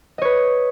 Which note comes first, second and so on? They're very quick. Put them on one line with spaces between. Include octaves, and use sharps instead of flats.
D#5 C#5 B4